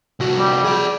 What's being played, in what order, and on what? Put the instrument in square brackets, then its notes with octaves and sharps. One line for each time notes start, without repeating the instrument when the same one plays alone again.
[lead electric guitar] C2 F#4
[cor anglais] G3
[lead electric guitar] G#4 D5